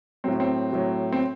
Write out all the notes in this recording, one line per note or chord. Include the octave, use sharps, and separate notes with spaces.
A2 F#3 C4
C4
A2 F#3
C4